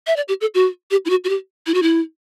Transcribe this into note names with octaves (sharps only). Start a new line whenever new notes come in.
E5
D5
G4
A4
F#4
G4
E4
F#4
F#4
G4
E4
F#4
E4